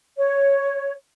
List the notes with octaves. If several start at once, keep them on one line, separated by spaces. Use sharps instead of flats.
C#5